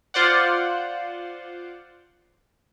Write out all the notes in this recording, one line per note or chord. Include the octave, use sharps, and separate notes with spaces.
F4 C5 D5 F#5